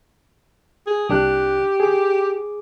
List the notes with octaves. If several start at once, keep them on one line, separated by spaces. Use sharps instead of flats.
G#4
C2 D4 G4 F#6
G#4 D6